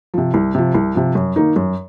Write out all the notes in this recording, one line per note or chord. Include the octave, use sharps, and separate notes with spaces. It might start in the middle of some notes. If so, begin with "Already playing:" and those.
C3 F3
C2
C3 F3
C2
C3 F3
F#2
D#3 A#3 D#4
F#2